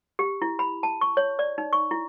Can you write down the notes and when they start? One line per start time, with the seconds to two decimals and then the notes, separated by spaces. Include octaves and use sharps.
0.19 G4
0.42 E4
0.59 B5
0.83 A5
1.01 C#6
1.17 C#5
1.39 D5
1.58 D#4
1.73 C#6
1.91 E4